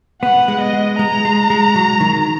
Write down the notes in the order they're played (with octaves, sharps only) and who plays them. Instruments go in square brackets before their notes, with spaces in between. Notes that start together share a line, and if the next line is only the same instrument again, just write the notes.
[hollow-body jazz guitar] B3 [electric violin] F#5
[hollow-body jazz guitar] G#3
[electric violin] D#5
[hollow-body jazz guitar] G#3
[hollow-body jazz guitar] G#3 [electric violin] A#5
[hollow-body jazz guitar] G#3
G#3
F#3
D#3